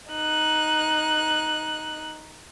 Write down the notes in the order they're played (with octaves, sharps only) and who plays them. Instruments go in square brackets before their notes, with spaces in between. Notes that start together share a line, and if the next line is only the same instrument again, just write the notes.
[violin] D#4 F#6